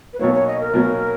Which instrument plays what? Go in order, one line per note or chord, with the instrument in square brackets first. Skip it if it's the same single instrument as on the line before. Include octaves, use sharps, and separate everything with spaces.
[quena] B4
[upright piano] B1 B2 F#3 A#3 [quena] C#5
[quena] C#5
D#5
A#4
[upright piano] B1 B2 F#3 A#3